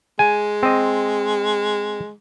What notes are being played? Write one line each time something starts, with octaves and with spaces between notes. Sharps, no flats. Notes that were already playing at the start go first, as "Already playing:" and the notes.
G#3 G#5
C4 D#5